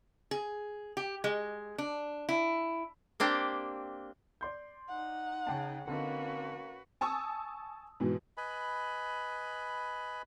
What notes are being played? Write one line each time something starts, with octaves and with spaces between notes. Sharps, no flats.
G#4
G4
G#3
D4
E4
A#3 C4 D4 G4
D5 C6 G6
D#4 F#5
C#3 G5 A5
D3 A#3 C4 C#4 D#4 F#4 B4
G#5 A5 C#6 D#6 E6
G#2 B2 E3
B4 D#5 G#5 B5